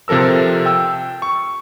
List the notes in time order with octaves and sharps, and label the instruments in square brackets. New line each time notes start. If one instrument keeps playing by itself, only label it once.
[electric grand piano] C3 F3 A4 A#4 E6
G5 E6
C#6